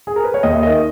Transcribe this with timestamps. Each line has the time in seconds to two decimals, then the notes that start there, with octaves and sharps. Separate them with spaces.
0.07 G#4
0.16 A#4
0.24 B4
0.34 C#5
0.43 D#2 D#5
0.53 E5
0.63 A#3 D#5
0.66 D#3